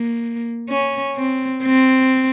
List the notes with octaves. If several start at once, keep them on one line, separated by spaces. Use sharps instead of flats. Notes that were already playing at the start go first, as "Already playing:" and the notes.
Already playing: A#3
C#4
C4
C4